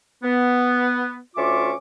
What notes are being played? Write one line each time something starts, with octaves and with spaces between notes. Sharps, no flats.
B3
D2 C#4 F4 E5 C#6 D6